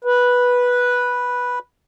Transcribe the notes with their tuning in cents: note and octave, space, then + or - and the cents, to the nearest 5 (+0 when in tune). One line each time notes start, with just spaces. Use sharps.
B4 -10